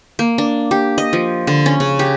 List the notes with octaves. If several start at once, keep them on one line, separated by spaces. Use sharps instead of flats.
A#3
D4
G4
D#5
F3
D3
C#4
C#3
G4